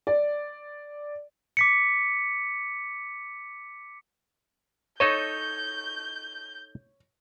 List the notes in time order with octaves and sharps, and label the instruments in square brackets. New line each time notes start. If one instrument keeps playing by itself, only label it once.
[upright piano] D5
[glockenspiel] D6 B6 C#7
[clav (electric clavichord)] D#4 A4 D#5 [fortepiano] C#5 [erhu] G6